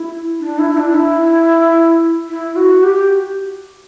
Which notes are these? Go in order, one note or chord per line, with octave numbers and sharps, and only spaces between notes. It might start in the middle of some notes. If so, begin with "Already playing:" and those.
Already playing: E4
D4
E4
E4
D4
E4
E4
F#4
G4